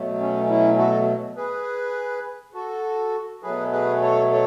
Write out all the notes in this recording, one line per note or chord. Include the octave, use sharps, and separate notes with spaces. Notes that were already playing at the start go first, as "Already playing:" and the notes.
Already playing: B2 F#3 A3
C#4
C#4 E4
F#4 A4
G#4 B4
F#4 A4
B2 F#3 A3 G#4 B4
G#4 B4
A4 C#5
A4 C#5